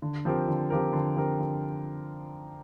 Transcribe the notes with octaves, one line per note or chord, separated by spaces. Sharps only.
D3
F3 C4 G4 A#4
D3
F3 C4 G4 A#4
D3
F3 C4 G4 A#4
D3